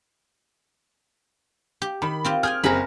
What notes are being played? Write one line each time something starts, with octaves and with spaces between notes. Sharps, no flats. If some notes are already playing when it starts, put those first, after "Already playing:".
G4
D#3 B5
C4 F4 G4
G#4 G5 G#5 F6
F#1 C4 G#4 A#4 B5